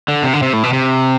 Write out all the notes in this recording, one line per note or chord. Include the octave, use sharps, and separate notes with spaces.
D3
C3
D3
C3
A2
B2
C3